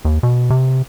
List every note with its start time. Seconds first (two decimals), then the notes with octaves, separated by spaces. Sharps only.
0.05 D#2
0.23 B2
0.50 C3